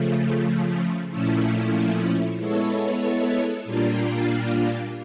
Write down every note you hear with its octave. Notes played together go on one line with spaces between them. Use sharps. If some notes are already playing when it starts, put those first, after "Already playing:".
Already playing: C#3 F3 A3
A#2 F3 A3 C#4 E4
G#3 B3 E4 A4 C#5
A#2 G3 A#3 D4 F4